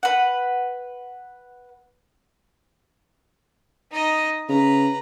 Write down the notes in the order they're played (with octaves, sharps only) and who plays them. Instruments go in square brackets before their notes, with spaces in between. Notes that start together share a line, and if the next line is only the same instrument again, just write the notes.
[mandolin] B4 F#5
[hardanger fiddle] D#4 D#5
[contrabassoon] C#3 [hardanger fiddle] B4 A#5